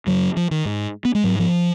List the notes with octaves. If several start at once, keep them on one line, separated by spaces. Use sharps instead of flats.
F#2 C#3 F#3
F3
D#3
G#2
B3
G#3
G#2 F#3
F3